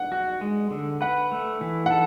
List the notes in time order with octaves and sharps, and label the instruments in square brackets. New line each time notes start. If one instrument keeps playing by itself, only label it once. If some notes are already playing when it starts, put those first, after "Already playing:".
Already playing: [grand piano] F#5
[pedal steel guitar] F#4
G#3
D3
[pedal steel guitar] B4 [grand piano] F#5
[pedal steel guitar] A3
E3
[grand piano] F#5
[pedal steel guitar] A4